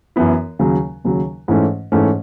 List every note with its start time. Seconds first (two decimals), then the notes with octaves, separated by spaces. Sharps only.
0.16 F#2 E3 B3 E4
0.59 D#2 C#3 F#3
1.04 D#2 C#3 F#3
1.48 G#2 E3 A3 C#4
1.92 G#2 E3 A3 C#4